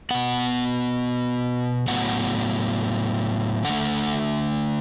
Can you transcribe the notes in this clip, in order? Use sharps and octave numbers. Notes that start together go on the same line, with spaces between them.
B2 B3 F#5
A2 F#3 B3 F#5
D3 A3 F#5